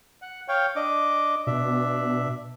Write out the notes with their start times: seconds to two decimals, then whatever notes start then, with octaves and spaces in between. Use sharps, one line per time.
0.22 F#5
0.48 C#5 F5 G5
0.76 D4 D#5 D6
1.47 B2 D4 E5